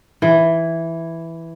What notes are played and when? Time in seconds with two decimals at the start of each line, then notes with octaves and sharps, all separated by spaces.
0.22 E3